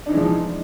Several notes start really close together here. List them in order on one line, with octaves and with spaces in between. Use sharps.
D4 D#4 E3 G#3 F3